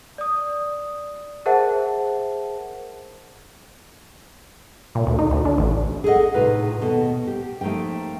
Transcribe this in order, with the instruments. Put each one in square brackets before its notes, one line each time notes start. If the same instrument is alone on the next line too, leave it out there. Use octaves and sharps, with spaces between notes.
[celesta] D5 D#6
G#4 A#4 C5 E5 F#5 A5
[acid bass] A#2
D2
D#4
D2
D4
A1
[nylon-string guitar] G#4 A4 C5 D#5 F#5
A2 C3 D#4 F4 B4
D#2 B2 A4
G4
F3 A3 A#3 D#4 G5